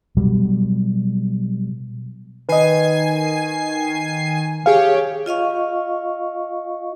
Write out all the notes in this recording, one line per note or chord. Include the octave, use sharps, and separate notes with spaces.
B2 F#3 G3
D#3 B4 D#5 G#5 C7
G4 G#4 C#5 F5
F4 D#5 F5 C#6